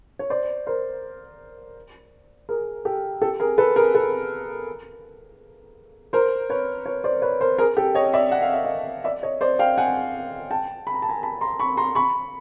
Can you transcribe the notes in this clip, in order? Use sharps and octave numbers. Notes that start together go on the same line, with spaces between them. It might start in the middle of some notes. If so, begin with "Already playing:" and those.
C#5
C5 D5
A#4 C5
G#4 A#4
G4 A4
G4 A4
G#4 A#4
A4 B4
G#4 A#4
A4 B4
A#4 C5
B4 C#5
B4 C#5
C5 D5
B4 C#5
A#4 C5
G#4 A#4
G4 A4
C#5 D#5
D5 E5
F#5
F5
E5
D#5 F5
D5 E5
C#5 D#5
C5 D5
F5 G5
F#5 G#5
G5 A5
B5
A#5
A5
G#5 A#5
A5 B5
A#5 C6
B5 C#6
A#5 C6
B5 C#6